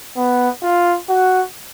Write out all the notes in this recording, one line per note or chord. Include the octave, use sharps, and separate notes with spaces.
B3
F4
F#4